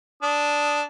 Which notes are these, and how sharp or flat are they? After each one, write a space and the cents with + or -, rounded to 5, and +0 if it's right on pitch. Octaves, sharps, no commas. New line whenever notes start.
D4 -5 D#6 +0